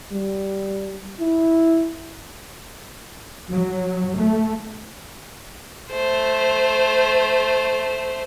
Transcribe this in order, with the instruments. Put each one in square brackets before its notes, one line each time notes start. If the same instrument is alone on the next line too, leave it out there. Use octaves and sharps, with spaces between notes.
[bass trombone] G3
E4
[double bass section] F#3
A3
[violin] A3 C5